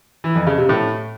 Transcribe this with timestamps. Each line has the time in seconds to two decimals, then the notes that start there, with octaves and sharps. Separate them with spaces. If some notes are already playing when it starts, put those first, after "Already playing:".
0.24 E3
0.35 F2
0.47 C#3
0.58 C3
0.69 A2